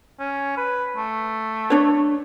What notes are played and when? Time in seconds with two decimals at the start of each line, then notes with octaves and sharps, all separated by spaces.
0.19 C#4
0.57 B4
0.97 A3
1.70 D4 C#5